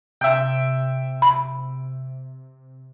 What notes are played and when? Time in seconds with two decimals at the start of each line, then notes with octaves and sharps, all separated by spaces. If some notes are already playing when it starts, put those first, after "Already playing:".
0.21 C3 E5 G5
1.22 B5